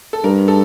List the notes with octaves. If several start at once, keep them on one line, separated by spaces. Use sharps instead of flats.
A4
G2 A#4
A4